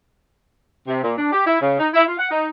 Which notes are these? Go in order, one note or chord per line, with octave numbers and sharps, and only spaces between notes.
C3
A#2
D4
G4
E4
C#3
D#4
E4
F4
F#5
D#4